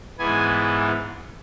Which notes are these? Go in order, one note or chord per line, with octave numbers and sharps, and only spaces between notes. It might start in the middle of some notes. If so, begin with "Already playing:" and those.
G#2 E3 B3 G#5